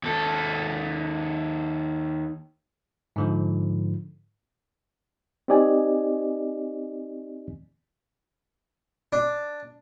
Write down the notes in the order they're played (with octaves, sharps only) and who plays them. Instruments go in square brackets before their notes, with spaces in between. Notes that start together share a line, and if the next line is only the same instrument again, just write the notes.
[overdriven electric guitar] D#2 A4
[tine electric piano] G#2 D3 F3
[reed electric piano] C4 D#4 G4 D5 D#5 G#5
[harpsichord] D4